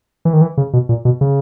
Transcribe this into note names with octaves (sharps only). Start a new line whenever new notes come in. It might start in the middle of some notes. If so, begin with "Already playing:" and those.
E3
D#3
E3
C#3
B2
A#2
B2
C#3